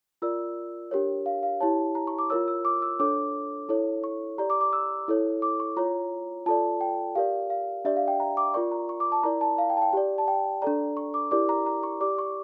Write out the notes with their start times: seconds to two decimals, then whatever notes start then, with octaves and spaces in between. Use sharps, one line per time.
0.22 F4 A#4 D5 E6
0.91 D4 G4 A#4 C#5
1.26 F5
1.43 F5
1.61 E4 G4 C#5 A5
1.95 A#5
2.07 C#6
2.19 D6
2.30 F4 A#4 C#5 E6
2.48 E6
2.65 D6
2.82 E6
3.00 D4 A4 C#5 D6
3.69 E4 A4 C#5
4.04 C#6
4.38 G4 D5 A#5
4.50 D6
4.61 D6
4.73 E6
5.08 E4 A4 C#5
5.42 D6
5.60 C#6
5.77 F4 C#5 A#5
6.46 F4 A4 D5 A5
6.81 G5
7.15 G4 A#4 D5 F5
7.50 F5
7.85 D4 G4 D5 E5
7.97 F5
8.08 G5
8.20 A#5
8.37 D6
8.54 F4 A#4 D5 C#6
8.72 A#5
8.89 C#6
9.00 D6
9.12 A5
9.23 E4 A#4 D5 A#5
9.41 A5
9.58 F5
9.70 G5
9.77 A5
9.82 G5
9.93 G4 D5
10.18 A5
10.28 G5
10.62 D4 A4 D5 A#5
10.97 C#6
11.14 D6
11.31 E4 G4 A#4 D5 D6
11.49 A#5
11.66 A#5
11.83 C#6
12.01 G4 D5 D6
12.18 C#6